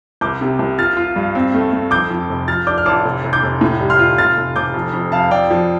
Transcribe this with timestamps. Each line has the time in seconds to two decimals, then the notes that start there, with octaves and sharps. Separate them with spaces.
0.21 C2 D6 G6
0.41 C3
0.59 C2
0.79 F4 F6 A6
0.97 F4
1.16 G2
1.35 C4
1.54 A3
1.73 A3
1.91 F2 D6 G6
2.11 F2
2.29 F1
2.48 F3 F6 A6
2.67 D4 D6 G6
2.78 F6
2.86 A1 A5 D6
3.05 F1
3.24 F1
3.33 D6 G6
3.43 F1
3.61 A2
3.80 G3
3.90 C6 F6
3.99 F4
4.18 F1 F6 A6
4.37 F1
4.55 F1 D6 G6
4.74 F2
4.93 F2
5.12 F2 F5 A5
5.31 F2 D5 G5
5.50 F3